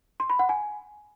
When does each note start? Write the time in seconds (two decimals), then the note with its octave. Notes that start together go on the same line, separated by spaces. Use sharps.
0.20 C6
0.30 B5
0.39 F#5
0.49 G#5